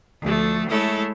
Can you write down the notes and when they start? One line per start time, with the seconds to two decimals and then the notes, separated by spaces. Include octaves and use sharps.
0.23 D2 F3 A3
0.68 G#3 A3 E4 A4 C#5